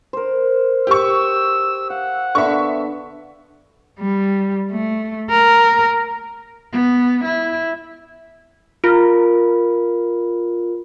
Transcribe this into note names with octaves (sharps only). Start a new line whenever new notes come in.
A#4 C5
G4 C#6 E6
F5 F#5
D3 B3 E5 C#6
G3
A3
A#4
B3
E4
F4 A#4